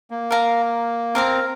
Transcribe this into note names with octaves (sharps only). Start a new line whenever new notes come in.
A#3
A#4 F5 A#5
C4 A#4 F5 A#5